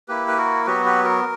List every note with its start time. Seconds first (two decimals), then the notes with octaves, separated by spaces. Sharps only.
0.08 A#3 E4 G4 B4
0.28 B4
0.37 F#4 A#4
0.66 F#3 B3 F#4 G4 B4
0.85 G4 B4
1.04 F#4 A#4